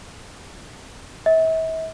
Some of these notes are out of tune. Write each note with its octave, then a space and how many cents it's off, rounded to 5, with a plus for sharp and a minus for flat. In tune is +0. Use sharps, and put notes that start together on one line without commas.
E5 -40